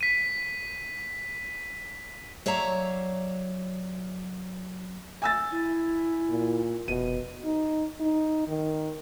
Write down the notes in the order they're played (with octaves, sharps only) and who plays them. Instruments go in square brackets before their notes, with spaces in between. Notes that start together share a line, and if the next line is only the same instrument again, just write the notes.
[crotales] B6 D#7
[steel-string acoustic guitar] F#3 C#5 D5 E5 F5 A#5
[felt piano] G#5 E6 A6
[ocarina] E4
[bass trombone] A#2
[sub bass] F1 [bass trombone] B2 [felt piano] D#7
[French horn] D#4
D#4
D#3